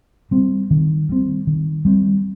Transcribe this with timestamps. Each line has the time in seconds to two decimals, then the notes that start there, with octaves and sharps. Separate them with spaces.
0.31 G3 C4
0.71 D#3
1.09 G3 C4
1.47 D#3
1.85 G3 C4